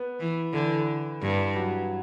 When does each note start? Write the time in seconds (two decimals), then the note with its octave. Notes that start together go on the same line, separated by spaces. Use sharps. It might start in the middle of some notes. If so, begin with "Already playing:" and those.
Already playing: B3
0.20 E3
0.53 D3 E3
1.22 G2
1.55 F#3